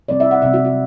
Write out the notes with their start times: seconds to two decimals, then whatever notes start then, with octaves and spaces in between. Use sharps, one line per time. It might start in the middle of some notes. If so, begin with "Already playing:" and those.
0.08 C3 G3 C4 D5
0.20 E5
0.31 F#5
0.42 C3 G3 C4 E5
0.53 F#4
0.65 F#4